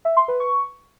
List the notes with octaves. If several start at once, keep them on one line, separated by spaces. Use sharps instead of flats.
E5
C6
B4
C#6